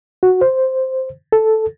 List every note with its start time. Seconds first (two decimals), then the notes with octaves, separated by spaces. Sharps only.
0.23 F#4
0.41 C5
1.32 A4